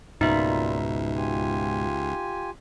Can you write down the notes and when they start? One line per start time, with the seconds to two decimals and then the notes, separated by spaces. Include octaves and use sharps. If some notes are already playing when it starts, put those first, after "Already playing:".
0.21 C#2 G#2 B2 G3 A#3 D#4 F4 E5
1.15 F4 G4 G#5